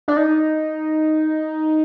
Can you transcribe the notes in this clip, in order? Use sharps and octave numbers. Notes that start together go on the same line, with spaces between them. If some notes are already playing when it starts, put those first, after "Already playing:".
D4
D#4